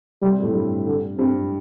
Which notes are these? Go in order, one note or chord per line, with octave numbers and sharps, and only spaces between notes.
C3 G3 C4
G3
A2 A3
G2 G3
D3
G2 G3 C4